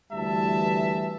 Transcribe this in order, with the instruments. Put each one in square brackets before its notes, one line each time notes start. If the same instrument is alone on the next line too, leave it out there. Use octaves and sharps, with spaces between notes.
[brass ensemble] D2 E3 G3 E5 A5